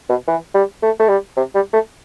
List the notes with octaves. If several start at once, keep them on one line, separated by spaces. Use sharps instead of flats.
B2
E3
G3
A3
A3
G3
C3
G3
A3